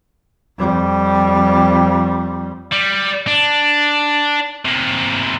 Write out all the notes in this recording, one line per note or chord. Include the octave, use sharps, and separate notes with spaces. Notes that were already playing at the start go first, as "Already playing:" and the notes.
F2 G3
G3
D4
C3 A#3